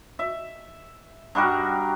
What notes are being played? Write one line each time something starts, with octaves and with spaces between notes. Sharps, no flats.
E5
G2 G3 F#4 A#4